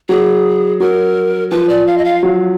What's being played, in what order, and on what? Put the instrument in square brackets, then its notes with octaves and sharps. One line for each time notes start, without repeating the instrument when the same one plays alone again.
[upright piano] F#3 [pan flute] G#4
[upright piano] F#3 [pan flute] A#4
[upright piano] F3 [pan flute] B4
[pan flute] D5
F5
D#5
F5
[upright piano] F#3